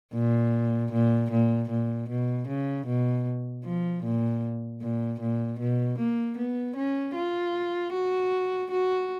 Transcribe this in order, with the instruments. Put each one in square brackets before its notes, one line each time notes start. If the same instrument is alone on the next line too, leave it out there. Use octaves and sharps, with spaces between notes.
[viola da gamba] A#2
A#2
A#2
A#2
B2
C#3
B2
F3
A#2
A#2
A#2
B2
A#3
B3
C#4
F4
F#4
F#4